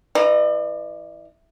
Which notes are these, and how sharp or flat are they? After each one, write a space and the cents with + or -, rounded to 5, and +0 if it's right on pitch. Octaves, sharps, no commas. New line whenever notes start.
E3 +5 D5 +45 A#5 +0